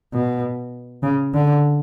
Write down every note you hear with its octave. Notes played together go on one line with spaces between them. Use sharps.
B2
C#3
D3